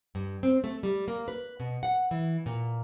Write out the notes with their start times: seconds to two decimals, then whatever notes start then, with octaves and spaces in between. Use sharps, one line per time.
0.15 G2
0.43 C4
0.64 A3
0.83 G3
1.08 A#3
1.28 B4
1.60 B2
1.83 F#5
2.11 E3
2.46 A#2